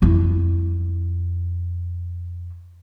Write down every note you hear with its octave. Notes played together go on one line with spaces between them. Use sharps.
F2 E4